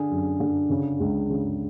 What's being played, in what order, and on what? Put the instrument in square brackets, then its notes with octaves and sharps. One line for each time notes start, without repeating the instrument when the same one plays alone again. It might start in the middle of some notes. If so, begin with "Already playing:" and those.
Already playing: [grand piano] D3 G#4
F#2
D3
C#3
C#2
C#3